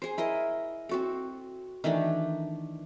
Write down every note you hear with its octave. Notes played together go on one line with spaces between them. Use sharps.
G#4 C5
E4 A#4 D#5
C4 F#4 A4
D#3 E3 A3 D4